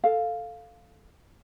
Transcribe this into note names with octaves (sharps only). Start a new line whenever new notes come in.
A4 F5